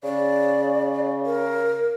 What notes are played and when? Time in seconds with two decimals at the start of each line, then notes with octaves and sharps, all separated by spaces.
0.03 C#3 D5
1.26 A#4